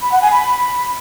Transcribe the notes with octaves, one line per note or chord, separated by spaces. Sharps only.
B5
F#5
G#5
B5